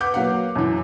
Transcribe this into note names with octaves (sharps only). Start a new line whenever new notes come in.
B4 F#5 D6 G6
F#3 A#3 B4 F5 F#5
F#2 E3